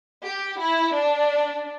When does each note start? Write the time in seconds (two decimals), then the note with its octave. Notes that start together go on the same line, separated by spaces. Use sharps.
0.23 G4
0.59 E4
0.94 D4